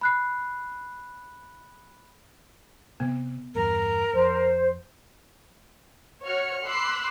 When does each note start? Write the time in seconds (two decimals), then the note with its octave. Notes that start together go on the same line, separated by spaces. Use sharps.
0.01 B5 F#6 C7
3.00 C3 B3
3.55 E2 G2 A#4
4.13 F2 C5
6.23 F#4 C#5 F6 C#7
6.64 B5 C6 D6 E6 F#6 C7